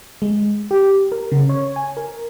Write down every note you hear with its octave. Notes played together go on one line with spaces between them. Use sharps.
G#3
G4
A#4
C#3
C#5
G#5
A#4